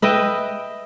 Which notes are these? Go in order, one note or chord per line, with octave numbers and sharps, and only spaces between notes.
B4 D#5 E5 G5